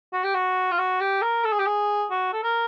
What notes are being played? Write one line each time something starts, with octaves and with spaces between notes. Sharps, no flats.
F#4
G4
F#4
F4
F#4
G4
A#4
A4
G#4
G4
G#4
F#4
A4
A#4